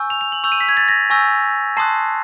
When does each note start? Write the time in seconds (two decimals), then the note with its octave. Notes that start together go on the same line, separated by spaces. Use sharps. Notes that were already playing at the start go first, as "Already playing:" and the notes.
Already playing: G#5 C#6 E6 G6
0.10 F7
0.21 F7
0.32 F#7
0.43 C#6 E6 G6 F7
0.52 D#7
0.60 B6
0.69 G#6
0.77 A6
0.88 A#6
1.10 G#5 C#6 E6 G6 A#6
1.77 A5 C6 D#6 F#6 C7